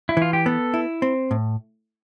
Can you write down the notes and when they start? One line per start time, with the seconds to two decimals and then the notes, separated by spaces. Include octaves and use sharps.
0.09 E4
0.17 E3 F4
0.33 G4
0.46 B3 A4
0.74 E4
1.02 C4
1.31 A2